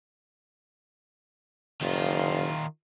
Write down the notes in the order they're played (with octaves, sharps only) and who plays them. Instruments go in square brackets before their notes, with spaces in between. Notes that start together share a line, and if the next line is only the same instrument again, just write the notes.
[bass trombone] F#1 [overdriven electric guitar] D#3 F4